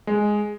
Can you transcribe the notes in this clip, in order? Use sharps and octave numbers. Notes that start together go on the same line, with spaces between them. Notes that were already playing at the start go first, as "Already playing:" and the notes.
G#3